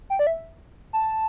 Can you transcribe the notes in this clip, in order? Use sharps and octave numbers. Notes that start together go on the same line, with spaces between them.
G5
D5
E5
A5